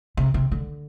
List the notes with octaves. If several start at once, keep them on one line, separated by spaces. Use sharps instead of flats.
C3
C3
D3